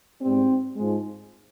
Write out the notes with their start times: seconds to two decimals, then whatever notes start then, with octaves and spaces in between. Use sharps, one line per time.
0.22 G#2 G3 C4
0.77 G#2 F3 G#3